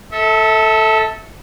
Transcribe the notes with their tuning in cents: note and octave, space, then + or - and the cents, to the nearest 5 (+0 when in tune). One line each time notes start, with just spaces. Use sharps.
A4 +5 E5 -30